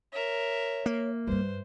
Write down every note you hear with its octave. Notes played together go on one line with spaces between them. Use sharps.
A#4 C#5 E5
A#3
G2 G3 B4 C5